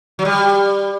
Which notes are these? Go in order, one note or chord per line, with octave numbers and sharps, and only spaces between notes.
F#3
G3